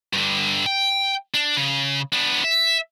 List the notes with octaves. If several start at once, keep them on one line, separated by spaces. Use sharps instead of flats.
G2 D3
G5
D4
C#3
B3 D4
E5